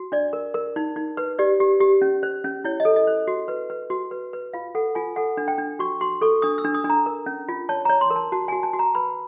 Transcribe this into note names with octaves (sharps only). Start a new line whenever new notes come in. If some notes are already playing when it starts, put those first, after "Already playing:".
Already playing: F#4
D4 D5
A#4
A#4
D#4
D#4
B4
G4 D5
G4
G4
C#4
C5
C#4
E4 C#5
D#5
A4
D#5
C5
F#4
B4
B4
F#4
B4
B4
F4 F5
A4 F#5
F4 G#5
A4 F#5
D4
G5
D4
F#4 C#6
F#4 C6
A4 C#6
D4 D#6
E6
D4
D#6
D4
A#5
A#4
C#4
F4
C#5 A5
C#5 A#5
C6
A#4
A5
F#4 A5
F#4 G#5
A5
F#4
A#5
B4 B5